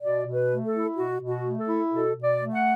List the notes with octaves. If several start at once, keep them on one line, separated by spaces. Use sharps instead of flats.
B2 D5
B2
B4
A3
A4
E4
B2 F#4
B2
F#4
A3
A4
E4
B2 A4
B2
D5
A3
F#5